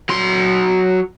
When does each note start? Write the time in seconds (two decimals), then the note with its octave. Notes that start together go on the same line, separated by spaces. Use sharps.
0.09 F#3 C6